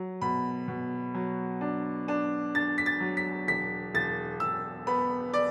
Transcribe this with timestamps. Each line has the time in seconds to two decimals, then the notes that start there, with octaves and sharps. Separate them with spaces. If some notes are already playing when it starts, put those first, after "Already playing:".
Already playing: F#3
0.21 B2 B5
0.68 B2
1.14 F#3
1.61 D4
2.08 D4
2.55 D4 A6
2.78 B6
2.86 A6
3.01 F#3
3.17 B6
3.48 E1 B6
3.94 E1 A6
4.40 E1 E6
4.87 B3 B5
5.34 D5